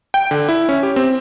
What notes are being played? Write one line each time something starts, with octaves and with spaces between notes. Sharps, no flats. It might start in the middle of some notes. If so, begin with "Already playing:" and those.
G5
D3
E4
C#4
G4
C4